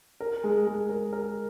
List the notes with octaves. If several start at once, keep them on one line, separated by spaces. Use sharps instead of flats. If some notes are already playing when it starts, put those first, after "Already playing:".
A#4
G#3
G#3
A#4
A#4